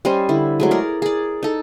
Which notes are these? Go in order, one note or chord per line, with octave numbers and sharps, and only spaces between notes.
G3 C#4 C5 D#5
D3 E4
F#3 G#3 A3
G#4 A#4 D5
G#4 D5
D#4 A4